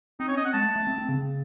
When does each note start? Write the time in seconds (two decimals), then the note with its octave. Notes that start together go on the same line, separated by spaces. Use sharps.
0.20 C4 D#4
0.28 C#5
0.31 C#4
0.37 D#5
0.42 C4 F#5
0.53 G#3 A5
0.65 A3
0.76 A3
0.87 C4
0.98 C4
1.09 C#3